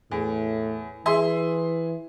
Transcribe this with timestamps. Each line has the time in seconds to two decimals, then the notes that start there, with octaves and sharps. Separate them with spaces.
0.11 E2 A2
1.06 E3 G#4 E5 C6